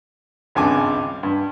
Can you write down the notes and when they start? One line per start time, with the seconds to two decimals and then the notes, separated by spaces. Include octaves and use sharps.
0.55 G#1 C#2 G2 G#5 A5 D6
1.23 G2